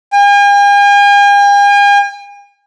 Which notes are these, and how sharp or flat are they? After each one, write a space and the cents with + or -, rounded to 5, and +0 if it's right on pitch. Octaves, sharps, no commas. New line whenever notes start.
G#5 -45